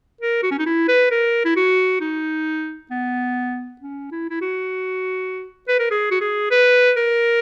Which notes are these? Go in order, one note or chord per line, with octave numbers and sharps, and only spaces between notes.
A#4
F#4
C#4
D#4
E4
B4
A#4
E4
F#4
D#4
B3
C#4
E4
E4
F#4
B4
A#4
G#4
F#4
G#4
B4
A#4